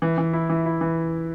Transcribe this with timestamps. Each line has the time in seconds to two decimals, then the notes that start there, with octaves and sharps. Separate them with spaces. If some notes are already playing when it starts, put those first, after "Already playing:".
0.02 E3
0.18 E3
0.33 E4
0.49 E3
0.66 E4
0.81 E3